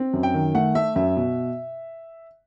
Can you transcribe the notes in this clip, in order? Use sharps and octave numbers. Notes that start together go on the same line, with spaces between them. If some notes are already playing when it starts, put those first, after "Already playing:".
Already playing: C4
F#2
G5
D#3
A3 F#5
A3 E5
F#2 E5
B2